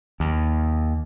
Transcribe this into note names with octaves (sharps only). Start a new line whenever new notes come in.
D#2